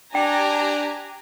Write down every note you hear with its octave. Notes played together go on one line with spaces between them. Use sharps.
D4 G4 G5 G#5 A#5